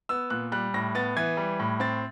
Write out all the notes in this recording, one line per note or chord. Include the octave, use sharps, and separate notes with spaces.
B3 E6
A#2 F#6
G3 F#6
A2 A#6
B3 A6
E3 G#6
G3
A2
C4 A6